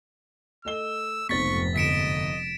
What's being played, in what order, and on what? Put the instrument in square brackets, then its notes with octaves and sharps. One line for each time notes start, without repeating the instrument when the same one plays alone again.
[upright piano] A3 D#5 G7 [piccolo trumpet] E6
[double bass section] F1 G#2 [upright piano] B1 C4 [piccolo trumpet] C#6 [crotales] A6 B6
[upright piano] G1 C#7 [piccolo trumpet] D#5 [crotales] B6 D7 E7